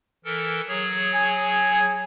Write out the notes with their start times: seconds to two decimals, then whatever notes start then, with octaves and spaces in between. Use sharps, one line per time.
0.25 E3 A4 A#4
0.68 F#3 G#4 C#5
1.14 G#5